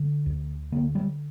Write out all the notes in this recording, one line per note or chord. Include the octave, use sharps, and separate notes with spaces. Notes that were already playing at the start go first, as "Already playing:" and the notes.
Already playing: D3
D2
D3 A#3
G3